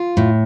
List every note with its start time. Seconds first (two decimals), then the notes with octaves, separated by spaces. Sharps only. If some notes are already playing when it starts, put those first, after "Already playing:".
Already playing: F4
0.17 A2